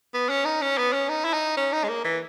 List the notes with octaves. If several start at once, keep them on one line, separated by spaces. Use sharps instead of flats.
B3
C#4
D#4
C#4
B3
C#4
D#4
E4
D#4
C#4
D#4
G#3
A#3
E3